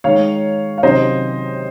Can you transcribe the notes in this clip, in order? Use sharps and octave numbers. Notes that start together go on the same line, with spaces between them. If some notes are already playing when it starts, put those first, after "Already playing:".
D#3 G#3 D#4 C#5 F5
F5
C3 D#3 F#3 C#4 C5 D#5